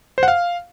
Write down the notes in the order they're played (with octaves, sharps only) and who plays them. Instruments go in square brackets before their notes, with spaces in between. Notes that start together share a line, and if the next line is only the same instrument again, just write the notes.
[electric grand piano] C5
F#5
F5